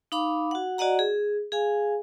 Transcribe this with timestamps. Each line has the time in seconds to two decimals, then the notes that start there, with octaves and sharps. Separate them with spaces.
0.12 D#4 F5 B5 D6
0.51 F#4 F#5
0.78 F#4 D5 D#5 F#5 A#5
0.99 G#4
1.52 G#4 F5 G#5